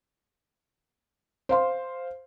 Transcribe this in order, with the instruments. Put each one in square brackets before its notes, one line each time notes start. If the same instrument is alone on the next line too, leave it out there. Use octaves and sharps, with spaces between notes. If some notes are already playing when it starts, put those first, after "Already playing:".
[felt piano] C5 F5 C6